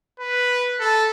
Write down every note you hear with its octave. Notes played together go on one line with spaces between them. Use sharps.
B4
A4